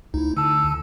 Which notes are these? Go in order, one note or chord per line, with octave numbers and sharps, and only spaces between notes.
D2 D#4 E4
D3 A5 E6